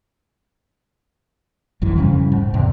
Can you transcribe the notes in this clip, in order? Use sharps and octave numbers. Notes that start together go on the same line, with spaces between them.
G#1 F#2 E3
F2 C#3 G3 C#4
G#2
E2 C3